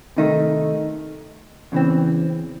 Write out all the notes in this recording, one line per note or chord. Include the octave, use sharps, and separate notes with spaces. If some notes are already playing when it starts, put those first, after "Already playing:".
C3 D#3 A3 D#4
E2 C#3 E3 C4